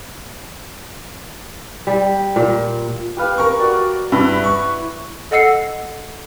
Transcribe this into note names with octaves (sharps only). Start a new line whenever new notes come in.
G3
A#2
G4 B4 F5
A#4 C#6
F#4 D5
G2 E4 B4
C#6
A4 D#5 F#5 E6 C7 C#7